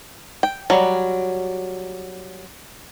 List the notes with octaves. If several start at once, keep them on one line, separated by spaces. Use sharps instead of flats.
G5
F#3 G3